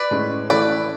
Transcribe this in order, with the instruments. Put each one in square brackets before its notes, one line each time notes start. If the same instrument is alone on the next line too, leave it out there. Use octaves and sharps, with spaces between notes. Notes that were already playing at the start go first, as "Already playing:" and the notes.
Already playing: [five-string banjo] B4 D5
[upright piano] A2 G#3 C#4
[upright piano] E3 A3 C#4 E4 A4 [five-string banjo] B4 D5